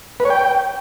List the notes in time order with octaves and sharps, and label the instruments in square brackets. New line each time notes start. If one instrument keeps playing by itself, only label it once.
[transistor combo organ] B4
C#5
G5